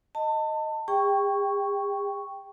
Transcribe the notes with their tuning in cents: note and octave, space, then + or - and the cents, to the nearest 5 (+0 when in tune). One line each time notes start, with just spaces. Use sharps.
D#5 +0 A5 +30
G#4 -45 G5 +0 C#6 +0